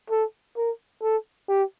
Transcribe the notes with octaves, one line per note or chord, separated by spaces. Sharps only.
A4
A#4
A4
G4